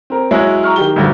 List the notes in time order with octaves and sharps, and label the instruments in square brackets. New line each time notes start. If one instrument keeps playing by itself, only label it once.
[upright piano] C4 A#4
[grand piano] F#3 G#3 E4 [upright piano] C#5
[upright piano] A#5 C#6 F6
D#3 G4 G7
[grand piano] D2 G2 F#3